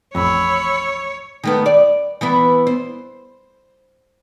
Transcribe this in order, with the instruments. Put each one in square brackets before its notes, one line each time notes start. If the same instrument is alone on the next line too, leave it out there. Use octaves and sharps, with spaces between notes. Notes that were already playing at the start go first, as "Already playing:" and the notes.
[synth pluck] A1 F2 [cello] C#5 [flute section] B5 E6
[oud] D#3 A3 B3
D5
E3 B3 E4
C5